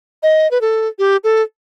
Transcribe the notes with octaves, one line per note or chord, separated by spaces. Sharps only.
D#5
B4
A4
G4
A4